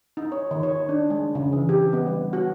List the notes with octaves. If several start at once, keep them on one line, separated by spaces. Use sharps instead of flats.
D#4
C#5
D#3
C#5
D4
G#3
C#3
E3
G4
B3
G3
F#4